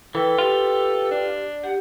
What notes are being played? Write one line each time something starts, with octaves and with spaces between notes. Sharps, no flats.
E3 A4 B4 G5
F4 G4
D4
G4 F#5